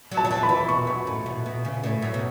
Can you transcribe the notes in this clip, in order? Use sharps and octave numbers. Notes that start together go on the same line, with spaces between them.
F#3
A5
F#3
E3
B5
E3
B2 C#6
F#2
A2
B2
B2
C#3
A2
F#2
B2